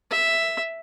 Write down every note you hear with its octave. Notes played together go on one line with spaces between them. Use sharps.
E5